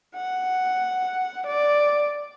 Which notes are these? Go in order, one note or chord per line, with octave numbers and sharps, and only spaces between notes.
F#5
D5